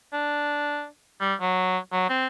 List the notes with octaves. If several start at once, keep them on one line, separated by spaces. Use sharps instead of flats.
D4
G3
F#3
F#3
C4